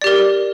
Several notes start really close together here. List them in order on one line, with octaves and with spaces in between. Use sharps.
D5 G4 A#4